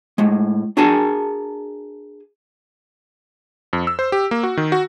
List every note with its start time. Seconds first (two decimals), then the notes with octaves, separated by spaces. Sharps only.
0.18 A2 G#3
0.77 D4 F#4 G#4 A#4 G#5 A5
3.73 F2
3.87 E6
3.99 C5
4.12 G4
4.31 A#3
4.43 F#4
4.57 D#3
4.72 F#4